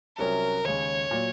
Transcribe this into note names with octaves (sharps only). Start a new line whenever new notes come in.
C2 C3 F#3 C#4 A#4
D#2 C#3 G#3 C#5
A#2 F#3